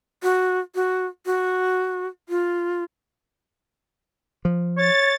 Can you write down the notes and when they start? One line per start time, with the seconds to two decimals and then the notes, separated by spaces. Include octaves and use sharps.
0.23 F#4
0.75 F#4
1.26 F#4
2.29 F4
4.45 F3
4.77 C#5 A6